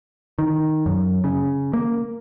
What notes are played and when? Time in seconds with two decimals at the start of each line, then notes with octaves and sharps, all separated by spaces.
0.39 D#3
0.86 F#2
1.24 C#3
1.73 A#3